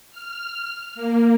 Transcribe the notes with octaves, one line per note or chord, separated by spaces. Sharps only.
F6
A#3